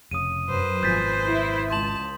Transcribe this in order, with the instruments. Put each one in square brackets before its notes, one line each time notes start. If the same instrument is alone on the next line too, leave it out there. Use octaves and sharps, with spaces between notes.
[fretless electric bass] F1 C#3 [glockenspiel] D#6 D#7
[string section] F#2 [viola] B4 C5
[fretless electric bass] G#1 B2 [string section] F3 G#4 [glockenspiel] G6 A6 B6
[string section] E4 E5
[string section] C#2 [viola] A5 [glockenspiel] C6 F#7